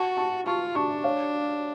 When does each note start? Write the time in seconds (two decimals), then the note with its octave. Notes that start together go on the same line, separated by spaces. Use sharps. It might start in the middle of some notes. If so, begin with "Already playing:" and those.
Already playing: F#4 A5 C#6
0.17 A5 C#6
0.46 F4 A5 C#6
0.75 D4 A5 C#6
1.04 C#5 F5